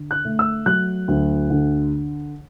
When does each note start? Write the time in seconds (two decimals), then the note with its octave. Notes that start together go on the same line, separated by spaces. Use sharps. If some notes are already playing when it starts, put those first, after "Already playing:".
Already playing: D3
0.11 F#6
0.25 A3
0.39 E6
0.66 F#3 F#6
1.08 D2
1.50 D3